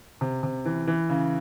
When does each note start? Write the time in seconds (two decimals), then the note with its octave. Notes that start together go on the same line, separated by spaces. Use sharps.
0.21 C3
0.43 C3
0.66 E3
0.87 E3
1.10 C#3